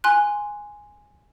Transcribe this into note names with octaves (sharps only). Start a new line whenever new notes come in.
G#5 C6 F#6